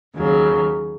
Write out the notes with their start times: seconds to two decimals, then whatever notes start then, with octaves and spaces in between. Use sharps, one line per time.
0.15 D#2 C#3 F#3